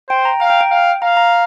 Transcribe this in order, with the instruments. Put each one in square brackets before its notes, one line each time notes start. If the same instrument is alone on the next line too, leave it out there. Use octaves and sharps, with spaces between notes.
[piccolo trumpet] C5 [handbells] G5
[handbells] A#5
[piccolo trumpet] F5 [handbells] A#5
[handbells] G5
G5
[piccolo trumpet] F5
[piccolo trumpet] F5 [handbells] A#5
[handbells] A#5